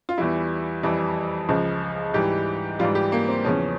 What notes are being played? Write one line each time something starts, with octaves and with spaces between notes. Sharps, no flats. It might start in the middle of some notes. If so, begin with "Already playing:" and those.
F4
E2 E3 G3 E4
F2 E3 G3 E4
C#2 C#3 F3
G#2 E3 G3 G4
G#2 E3 G3 F4
G4
A#3
C4
E2 C#3 F3 C#4